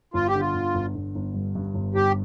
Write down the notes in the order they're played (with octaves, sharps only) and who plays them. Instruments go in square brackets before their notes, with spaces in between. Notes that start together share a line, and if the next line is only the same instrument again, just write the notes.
[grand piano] G1 [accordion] F4
[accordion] G4
[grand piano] D3
[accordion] F4
[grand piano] G1
G1
G1
G1
G2
G2
G1
[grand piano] G1 [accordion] G4